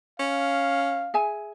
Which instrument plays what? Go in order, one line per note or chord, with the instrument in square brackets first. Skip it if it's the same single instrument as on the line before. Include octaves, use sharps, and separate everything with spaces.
[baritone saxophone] C#4 [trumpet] F5
[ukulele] G#4 E5 G#5